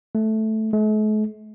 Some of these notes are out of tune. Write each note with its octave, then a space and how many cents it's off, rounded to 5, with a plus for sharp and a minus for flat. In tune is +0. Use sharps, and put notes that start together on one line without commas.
A3 -5
A3 -45